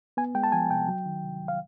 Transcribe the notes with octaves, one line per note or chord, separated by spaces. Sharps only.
B3 G#5
G#3 G5
A5
F3 G#5
C3 G5
F#3
D#3
C3
C#2
F5